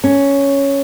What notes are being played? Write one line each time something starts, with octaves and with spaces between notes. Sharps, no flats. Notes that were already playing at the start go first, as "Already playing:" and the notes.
C#4